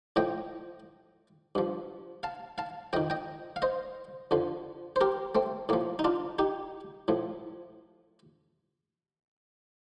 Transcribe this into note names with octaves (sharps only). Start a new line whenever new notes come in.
A2 F3 D#5 G5
G2 F3
F5 A5
F5 A5
F2 D#3 D#5 G5
D#5 G5
F5
C5 D#5
F2 D3 F3
C5
G4 A#4
A3 C4
A2 F3 A#3
D#4
D4 F4
D#4 G4
A2 F3